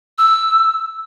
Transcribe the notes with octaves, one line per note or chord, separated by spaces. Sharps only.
E6